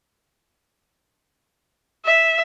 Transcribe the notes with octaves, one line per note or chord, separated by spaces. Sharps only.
E5